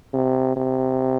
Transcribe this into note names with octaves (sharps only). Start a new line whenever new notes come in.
C3
C3